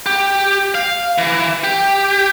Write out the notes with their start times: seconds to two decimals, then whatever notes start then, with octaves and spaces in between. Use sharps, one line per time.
0.06 G4
0.75 F5
1.18 E3
1.64 G4